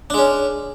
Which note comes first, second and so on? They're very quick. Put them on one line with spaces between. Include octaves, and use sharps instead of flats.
D4 G#3 C#4